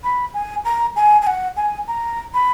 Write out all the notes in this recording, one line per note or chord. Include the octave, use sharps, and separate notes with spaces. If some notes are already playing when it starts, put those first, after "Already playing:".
B5
G#5
A#5
G#5
G#5
F#5
G#5
A#5
B5